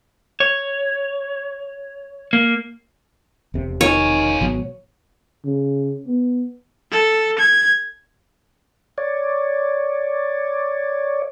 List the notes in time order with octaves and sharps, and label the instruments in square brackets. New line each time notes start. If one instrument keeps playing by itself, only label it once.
[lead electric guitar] C#5
A#3
[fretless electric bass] E1 C3
[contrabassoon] D#3 [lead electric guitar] F4 G#4 [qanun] C#5
[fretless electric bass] G#1 B2 F#3
[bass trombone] C#3
B3
[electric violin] A4
G#6
[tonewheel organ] C#5 D5